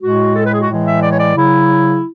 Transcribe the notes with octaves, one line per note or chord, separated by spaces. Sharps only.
A2 G#3 F#4
A4
B4
G#4
F#4
A2 E3 G#3
E5
D5
C#5
D5
C#3 F#3 E4